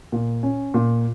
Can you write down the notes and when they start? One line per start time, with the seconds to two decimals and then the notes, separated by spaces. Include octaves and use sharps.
0.12 A#2
0.43 C#4
0.74 A#2